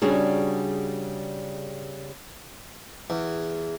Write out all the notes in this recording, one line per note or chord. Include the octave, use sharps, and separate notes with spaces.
C#3 G3 D4 F#4 G#4
E2